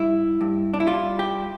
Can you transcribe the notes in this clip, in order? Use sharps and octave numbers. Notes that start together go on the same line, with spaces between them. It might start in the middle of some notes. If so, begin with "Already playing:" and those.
Already playing: G2 E4
G2
D4
E4
G3 F4
G4